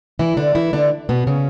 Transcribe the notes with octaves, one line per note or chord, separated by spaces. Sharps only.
E3 E4
D3 D4
E3 E4
D3 D4
B2 B3
C#3 C#4